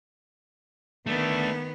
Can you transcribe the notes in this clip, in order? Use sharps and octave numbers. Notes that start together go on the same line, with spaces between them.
D#3 A3 B3 D4